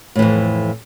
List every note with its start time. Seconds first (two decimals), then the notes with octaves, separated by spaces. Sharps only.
0.16 A2
0.19 E3
0.22 F2